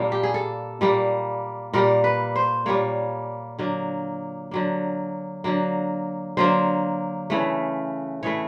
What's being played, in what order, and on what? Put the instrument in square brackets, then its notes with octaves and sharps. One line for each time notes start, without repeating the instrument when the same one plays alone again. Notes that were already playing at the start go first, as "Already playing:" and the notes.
Already playing: [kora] A#2 G3 A#3 A4
G4
G#4
A4
A#2 G3 A#3
A#2 G3 A#3 A#4
B4
C5
A#2 G3 A#3 C#5
D3 F#3 A#3
D3 F#3 A#3
D3 F#3 A#3
D3 F#3 A#3 C5
C#3 E3 A3
C#3 E3 A3 C#5